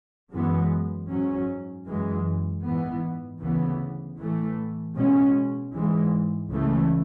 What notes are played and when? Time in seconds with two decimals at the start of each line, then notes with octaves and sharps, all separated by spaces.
0.31 F#2 E3 G#3 B3
1.10 G#2 F#3 C#4
1.86 F#2 E3 G#3
2.63 G#2 E3 B3
3.41 D2 C#3 E3 B3
4.18 A2 E3 A3
4.96 B2 G#3 C#4
5.74 G#2 E3 G#3
6.51 C#2 C#3 E3 A3